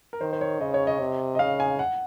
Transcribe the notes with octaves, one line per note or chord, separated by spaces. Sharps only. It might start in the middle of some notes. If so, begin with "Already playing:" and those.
A#4
D#3 C5
C5
C#5
C#3 D#5
C#5
D#5
C3
D#5
C#3 F5
G#5
F#5